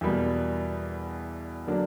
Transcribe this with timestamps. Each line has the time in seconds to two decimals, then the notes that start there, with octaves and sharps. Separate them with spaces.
0.01 E2 B2 G3 A#3
1.67 D3 F#3 A#3 D4